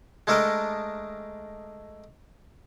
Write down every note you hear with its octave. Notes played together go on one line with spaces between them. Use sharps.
G#3 A3 D4 A4 A#4 D#5